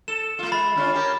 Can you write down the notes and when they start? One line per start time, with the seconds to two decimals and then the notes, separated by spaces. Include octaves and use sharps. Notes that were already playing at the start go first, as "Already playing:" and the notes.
0.08 A4 E7
0.39 A3 F4
0.52 G#3 B5 A6
0.76 D3 C#4 F4
0.93 C#4 G4 A#4